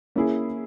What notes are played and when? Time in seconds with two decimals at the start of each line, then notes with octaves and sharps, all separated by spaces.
0.16 A#3 C#4 E4 G#4